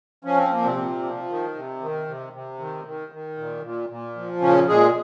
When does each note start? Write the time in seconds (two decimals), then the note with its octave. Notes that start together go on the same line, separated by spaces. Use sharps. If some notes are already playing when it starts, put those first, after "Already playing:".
0.24 F3 C#4
0.38 C4
0.51 A#2 A#3
0.65 C3 C4
0.76 A#2
1.03 F3
1.29 D#3
1.55 C3
1.81 D#3
2.07 C3
2.33 C3
2.59 D#3
2.85 D#3
3.12 D#3
3.38 A#2
3.63 A#2
3.90 A#2
4.16 F3
4.41 A#2 C#3 C#4
4.68 A#2 G#3 G#4